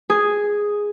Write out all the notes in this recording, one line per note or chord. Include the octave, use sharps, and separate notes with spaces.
G#4